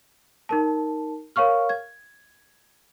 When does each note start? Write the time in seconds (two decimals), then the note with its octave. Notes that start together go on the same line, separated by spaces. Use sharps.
0.49 D#4 A#4 A5
1.36 A#4 C#5 F5 C#6 F6
1.69 G#6